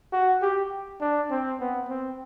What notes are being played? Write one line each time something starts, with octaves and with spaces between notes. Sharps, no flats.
F#4
G4
D4
C4
B3
C4